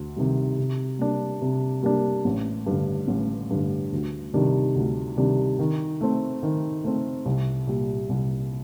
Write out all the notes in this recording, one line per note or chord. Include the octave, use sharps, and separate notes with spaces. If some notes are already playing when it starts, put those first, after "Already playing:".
Already playing: D2
C3 D#3 G3
C3
G3 A#3 D4
C3
G3 A#3 D4
A1
G2
D3
A1
G2 D3
D2
C3 D#3 G3 D4
D2
C3 D#3 G3 D4
D#3
A3 C4
D#3
A3 C4
C2
A#2 G3
C2